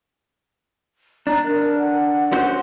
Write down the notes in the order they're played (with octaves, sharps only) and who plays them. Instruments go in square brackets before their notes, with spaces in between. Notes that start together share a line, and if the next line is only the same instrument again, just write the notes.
[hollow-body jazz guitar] D4 [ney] A#5
[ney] A#4
F#5
[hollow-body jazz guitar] C#4 F#4 C5